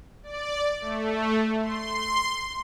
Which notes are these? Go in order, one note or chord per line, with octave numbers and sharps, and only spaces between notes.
D5
A3
C6